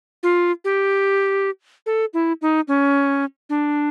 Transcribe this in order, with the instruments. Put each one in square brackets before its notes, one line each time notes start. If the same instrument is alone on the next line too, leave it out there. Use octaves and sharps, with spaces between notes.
[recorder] F4
G4
A4
E4
D#4
C#4
D4